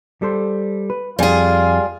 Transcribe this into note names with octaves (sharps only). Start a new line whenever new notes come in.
G3 A4 C5
B4
F2 G3 F4 G#4 G#5